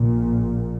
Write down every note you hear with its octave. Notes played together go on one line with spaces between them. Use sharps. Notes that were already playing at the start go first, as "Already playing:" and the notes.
Already playing: A#1 A#2